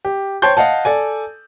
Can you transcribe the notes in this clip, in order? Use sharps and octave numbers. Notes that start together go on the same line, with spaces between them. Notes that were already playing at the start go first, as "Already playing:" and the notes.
G4
C5 C#5 G5 A5 C6 G6
D#5 F5 F#5 A5
A4 D5 G#5